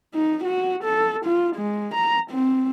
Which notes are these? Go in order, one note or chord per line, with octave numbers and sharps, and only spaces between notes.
D#4
F#4
A4
F4
G#3
A#5
C4